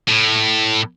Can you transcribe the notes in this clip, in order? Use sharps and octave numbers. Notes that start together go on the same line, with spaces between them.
A2